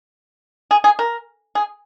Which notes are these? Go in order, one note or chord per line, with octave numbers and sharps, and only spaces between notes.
G#4
G#4
A#4
G#4